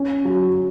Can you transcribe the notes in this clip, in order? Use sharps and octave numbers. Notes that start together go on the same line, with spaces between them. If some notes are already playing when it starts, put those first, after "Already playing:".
Already playing: C#4
F#3